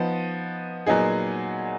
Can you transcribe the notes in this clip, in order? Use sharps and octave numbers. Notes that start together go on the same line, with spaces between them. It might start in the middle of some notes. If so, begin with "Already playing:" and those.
Already playing: F3 B3 D#4
A#2 F#3 B3 D#4 G#4